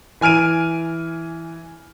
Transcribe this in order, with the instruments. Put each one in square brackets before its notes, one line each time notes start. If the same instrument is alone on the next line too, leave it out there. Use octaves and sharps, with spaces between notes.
[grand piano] E3 G#5 F6 D7 D#7